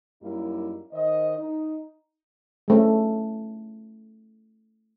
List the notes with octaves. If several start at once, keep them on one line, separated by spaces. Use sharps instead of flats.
F#2 G3 A#3 D#4 E4
D#3 C5 D#5
D#4
G#3 A3 C#4